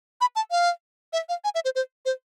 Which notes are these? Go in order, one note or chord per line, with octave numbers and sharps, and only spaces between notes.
B5
A5
F5
E5
F5
G#5
E5
C5
C5
C5